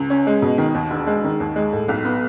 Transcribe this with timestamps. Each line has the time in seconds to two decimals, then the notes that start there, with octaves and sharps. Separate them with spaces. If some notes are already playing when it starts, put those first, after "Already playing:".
Already playing: C#2
0.10 C#4
0.27 G#3
0.42 B2
0.58 D#3
0.74 D#2
0.91 E1
1.07 G#3
1.24 D#3
1.40 D#2
1.56 G#3
1.73 A2
1.88 B1
2.05 B3